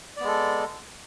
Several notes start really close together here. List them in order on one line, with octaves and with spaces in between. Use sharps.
D5 B3 G#3 A4